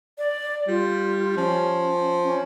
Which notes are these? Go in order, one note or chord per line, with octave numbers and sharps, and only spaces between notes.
D5
G3 F4
F3 C#4
C#4